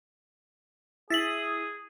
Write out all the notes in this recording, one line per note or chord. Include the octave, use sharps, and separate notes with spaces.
E4 G#4 D#6 A6 B6 F#7